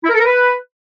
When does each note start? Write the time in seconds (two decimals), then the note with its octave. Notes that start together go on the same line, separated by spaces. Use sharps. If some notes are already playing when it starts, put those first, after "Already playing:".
0.03 E4
0.09 A#4
0.14 A4
0.19 A#4
0.24 B4